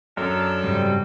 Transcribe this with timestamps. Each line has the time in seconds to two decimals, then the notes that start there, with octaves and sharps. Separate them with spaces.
0.17 F#2 D4 A4 A#4
0.64 G#2 C#3 G3 C4